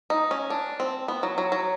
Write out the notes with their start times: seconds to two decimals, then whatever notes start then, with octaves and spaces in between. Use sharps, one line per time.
0.10 D#4
0.31 C#4
0.50 D4
0.80 C4
1.08 B3
1.23 F#3
1.38 F#3
1.52 F#3